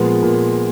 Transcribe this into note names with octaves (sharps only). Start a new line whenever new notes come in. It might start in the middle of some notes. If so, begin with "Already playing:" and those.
Already playing: A#2 F3 G#3 B3
A#2